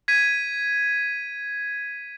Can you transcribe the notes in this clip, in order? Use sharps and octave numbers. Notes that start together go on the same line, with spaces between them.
G#6 B6 D#7